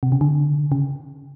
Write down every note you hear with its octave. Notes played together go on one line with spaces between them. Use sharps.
C3
C#3
D3
C#3